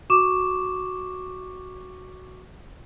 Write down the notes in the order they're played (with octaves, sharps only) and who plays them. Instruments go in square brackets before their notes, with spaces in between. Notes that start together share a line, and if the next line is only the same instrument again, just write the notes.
[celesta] F#4 C#6 D6 E7